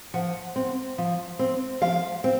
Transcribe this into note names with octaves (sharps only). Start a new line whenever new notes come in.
F3 F#5
C4
F3
C4
F3 F5
C4